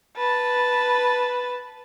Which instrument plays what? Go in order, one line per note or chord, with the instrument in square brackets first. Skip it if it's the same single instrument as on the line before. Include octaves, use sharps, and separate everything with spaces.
[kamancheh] B4 A5